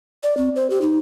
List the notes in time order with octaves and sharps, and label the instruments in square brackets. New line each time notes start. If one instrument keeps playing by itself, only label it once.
[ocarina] D5
C4
C5
G4
D#4